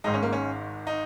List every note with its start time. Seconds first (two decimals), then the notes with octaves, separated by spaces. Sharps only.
0.04 G#1 G#2 G#3 D#4
0.14 C#4
0.23 A#3
0.33 C#4
0.87 D#4